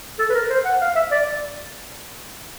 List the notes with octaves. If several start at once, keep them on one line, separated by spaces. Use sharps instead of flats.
A4
B4
A#4
C5
F#5
F5
E5
D5